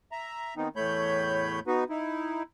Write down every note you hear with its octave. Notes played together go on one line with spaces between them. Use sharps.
E5 A#5
D#3 B3 C4 D#4
E2 A2 A3 C#5 B5 G6
B3 D#4 F#4 B4
D#4 E4